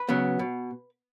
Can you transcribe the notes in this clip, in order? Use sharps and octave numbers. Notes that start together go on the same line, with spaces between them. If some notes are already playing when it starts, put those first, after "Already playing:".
Already playing: B4
C#3 F#3 B3
B2